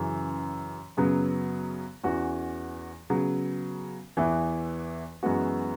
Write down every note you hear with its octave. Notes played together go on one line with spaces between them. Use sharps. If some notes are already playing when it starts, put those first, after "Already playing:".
Already playing: F#2 C#3 E3
F#2 C#3 F#3 B3
E2 E3 C#4 F#4
C#3 F#3 B3
E2 E3 B3 E4
F#2 E3 G#3 B3 F#4